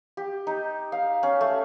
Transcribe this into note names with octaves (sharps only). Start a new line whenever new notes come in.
G4
D#4
F5
C#4
A3